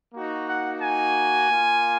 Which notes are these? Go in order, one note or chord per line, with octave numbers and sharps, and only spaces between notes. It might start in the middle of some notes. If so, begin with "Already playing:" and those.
A#3 D#4 F#4
F#5
G#5
A#3 F4